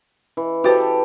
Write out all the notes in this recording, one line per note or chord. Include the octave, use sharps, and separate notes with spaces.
E3
F#4 G4 A4 B4 C5